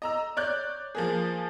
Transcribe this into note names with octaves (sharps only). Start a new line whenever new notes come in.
D#5 A#5 E6
C#5 D5 F#6 G6
F3 A#3 G#4